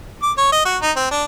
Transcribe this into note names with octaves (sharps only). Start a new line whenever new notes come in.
D6
C#5
D#5
F#4
D#4
C4
D4